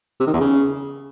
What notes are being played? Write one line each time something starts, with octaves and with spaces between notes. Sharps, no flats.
C3
D#3
E2
C#3